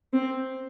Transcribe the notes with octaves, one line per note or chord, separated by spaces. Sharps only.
C4